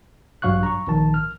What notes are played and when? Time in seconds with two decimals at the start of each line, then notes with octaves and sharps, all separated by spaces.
0.42 A1 G2 F#3 F5 C#6 F#6
0.63 A#5 C#6
0.87 A#1 D#3 A5
1.14 F6